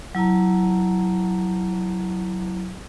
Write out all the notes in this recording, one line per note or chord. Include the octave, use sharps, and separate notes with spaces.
F#3 E4 A5 A#5